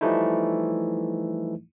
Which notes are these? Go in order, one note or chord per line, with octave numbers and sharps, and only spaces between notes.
E3 F3 G3 A3 D#4 E4